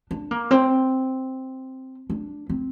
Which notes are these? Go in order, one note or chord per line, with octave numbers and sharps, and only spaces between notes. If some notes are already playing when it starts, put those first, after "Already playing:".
D4
A#3
C4
D4
C4